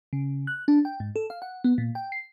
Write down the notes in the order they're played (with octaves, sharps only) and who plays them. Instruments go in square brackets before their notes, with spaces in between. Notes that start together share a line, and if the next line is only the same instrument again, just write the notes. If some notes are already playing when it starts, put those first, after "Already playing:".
[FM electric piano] C#3
F#6
D4
G5
G#2
A4
F5
F#5
B3
A#2
G5
C7